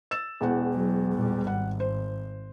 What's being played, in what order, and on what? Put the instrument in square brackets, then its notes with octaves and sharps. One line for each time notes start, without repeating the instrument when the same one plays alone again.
[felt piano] E6 A6 E7
E1 E2 F#5
[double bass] F#3
A#2 G3
[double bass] G#1 [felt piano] F#5
[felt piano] C5